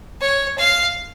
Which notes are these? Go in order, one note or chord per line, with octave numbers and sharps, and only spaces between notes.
C#5
F5